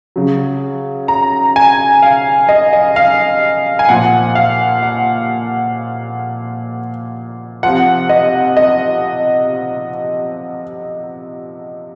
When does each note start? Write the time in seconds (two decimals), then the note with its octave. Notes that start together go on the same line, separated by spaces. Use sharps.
0.16 C#3 F#3
1.08 A#5
1.56 G#5
2.02 F5
2.49 D#5
2.73 D#5
2.96 F5
3.79 G#5
3.89 A#2 F3 F#5
4.35 F5
4.83 F#5
7.63 C3 F3 F#5
8.09 D#5
8.57 D#5